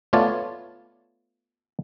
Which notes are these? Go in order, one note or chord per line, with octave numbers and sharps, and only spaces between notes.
A3 B3 F4 C#5 D5 A5